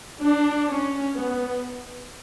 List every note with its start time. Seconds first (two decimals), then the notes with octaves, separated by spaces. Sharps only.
0.21 D4
0.69 C#4
1.15 B3